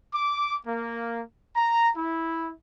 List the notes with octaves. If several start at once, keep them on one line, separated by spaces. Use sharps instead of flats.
D6
A#3
A#5
E4